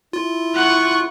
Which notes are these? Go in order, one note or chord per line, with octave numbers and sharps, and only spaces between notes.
E4 F4
F#5 C#6